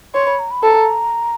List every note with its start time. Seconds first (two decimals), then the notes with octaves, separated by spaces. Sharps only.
0.15 C#5 C6
0.27 B5
0.39 A#5
0.51 B5
0.63 A4 B5
0.69 A#5